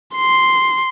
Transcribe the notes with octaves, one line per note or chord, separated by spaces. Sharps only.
C6